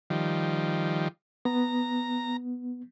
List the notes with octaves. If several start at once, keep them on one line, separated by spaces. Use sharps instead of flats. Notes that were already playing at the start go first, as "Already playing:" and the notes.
D#3 F3 G3
B3 A#5